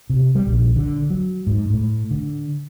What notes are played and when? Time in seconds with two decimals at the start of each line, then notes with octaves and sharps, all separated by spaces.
0.10 C3
0.35 G3
0.47 A#1
0.76 D3
1.10 F#3
1.47 G#2
1.70 A2
2.11 D3